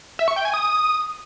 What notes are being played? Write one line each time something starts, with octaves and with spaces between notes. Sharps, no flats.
E5
C#6
G5
G#5
D#6